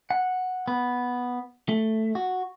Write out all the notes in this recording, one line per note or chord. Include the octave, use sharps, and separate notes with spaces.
F#5
B3
A3
F#4